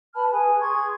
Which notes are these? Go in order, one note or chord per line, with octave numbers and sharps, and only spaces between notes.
B4 A5 B5 F6
G#4 B4 G#5
G#4 C6 C#6 G#6